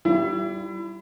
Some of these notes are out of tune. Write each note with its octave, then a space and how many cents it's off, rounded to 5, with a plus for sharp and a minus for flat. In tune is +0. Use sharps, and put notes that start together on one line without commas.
G3 -20 E4 +30